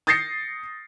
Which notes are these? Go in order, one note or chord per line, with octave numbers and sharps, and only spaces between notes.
D#6 G6 A6 A#6 C7 C#7